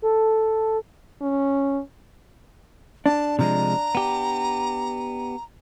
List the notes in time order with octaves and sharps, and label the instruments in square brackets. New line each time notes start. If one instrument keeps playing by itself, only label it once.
[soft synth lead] A4
[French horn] C#4
[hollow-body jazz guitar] D4 [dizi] A5
[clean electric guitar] C3 F3 G#3 [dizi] A#5
[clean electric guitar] B3 G4